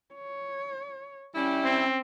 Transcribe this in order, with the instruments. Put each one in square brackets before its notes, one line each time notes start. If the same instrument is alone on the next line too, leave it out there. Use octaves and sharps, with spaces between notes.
[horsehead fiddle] C#5
[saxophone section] G3 E4 [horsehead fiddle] C#4 G5
[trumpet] C4